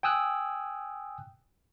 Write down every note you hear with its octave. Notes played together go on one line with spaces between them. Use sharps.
G5 G#5 D#6 E6 F#6